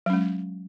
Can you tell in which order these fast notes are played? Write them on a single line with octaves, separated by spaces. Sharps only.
F#3 C#4 G#3